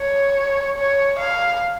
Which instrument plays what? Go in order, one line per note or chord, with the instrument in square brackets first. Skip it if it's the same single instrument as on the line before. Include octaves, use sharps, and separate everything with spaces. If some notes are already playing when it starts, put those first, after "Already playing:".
Already playing: [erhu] C#5
C#5
F5